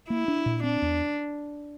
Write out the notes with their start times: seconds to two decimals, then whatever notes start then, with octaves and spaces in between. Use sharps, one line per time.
0.10 A#3 E4
0.28 D4
0.46 A#2
0.63 C4 D4
0.82 E2